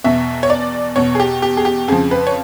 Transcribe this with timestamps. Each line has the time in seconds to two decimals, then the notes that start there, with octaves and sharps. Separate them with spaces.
0.04 E2 B2 E5
0.43 C#5
0.50 D5
0.96 E2 B2 C#5
1.15 G#4
1.20 G4
1.42 G4
1.57 G#4
1.65 G4
1.88 F2 C#3 F3 G#4
2.11 B4
2.27 C#5